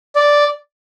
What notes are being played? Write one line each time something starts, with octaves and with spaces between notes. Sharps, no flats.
D5